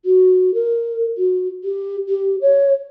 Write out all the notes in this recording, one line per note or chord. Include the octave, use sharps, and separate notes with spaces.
F#4
A#4
F#4
G4
G4
C#5